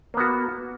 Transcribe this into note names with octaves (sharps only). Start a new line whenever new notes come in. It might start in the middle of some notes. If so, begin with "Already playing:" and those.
A#3 B3 F#4